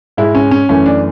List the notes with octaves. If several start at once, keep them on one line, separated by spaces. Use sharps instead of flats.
G#2 G#3 E4
C#4
C#4
F#2 E3 A3 C#4
D4